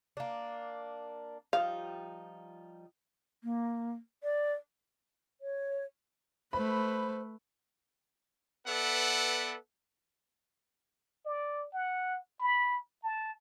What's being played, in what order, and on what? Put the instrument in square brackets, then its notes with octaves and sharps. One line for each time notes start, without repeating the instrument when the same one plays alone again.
[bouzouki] A#3 D4
[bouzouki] F3 G3 D#4 [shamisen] F5
[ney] A#3
D5
[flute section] C#5
[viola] A3 B4 [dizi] C5 [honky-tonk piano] B5
[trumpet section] B3 A4 B4 D5 E5 F#5
[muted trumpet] D5
F#5
B5
A5